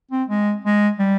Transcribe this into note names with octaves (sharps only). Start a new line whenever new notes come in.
C4
G#3
G#3
G3